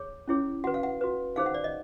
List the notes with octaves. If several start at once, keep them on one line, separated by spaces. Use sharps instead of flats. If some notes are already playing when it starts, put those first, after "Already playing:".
Already playing: G#4 C#5
C#4 E4 G#4 C#5
F#4 B4 F#5
F5
F#5
F#4 B4
D#4 G#4 C5 F5
F#5
D5
D#5